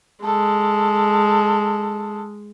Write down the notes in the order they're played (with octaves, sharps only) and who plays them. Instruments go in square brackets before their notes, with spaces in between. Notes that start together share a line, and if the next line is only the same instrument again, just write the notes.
[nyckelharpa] G#3 [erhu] A4